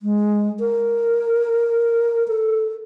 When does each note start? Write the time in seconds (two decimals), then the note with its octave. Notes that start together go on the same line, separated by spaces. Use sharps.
0.02 G#3
0.60 A#4
2.28 A4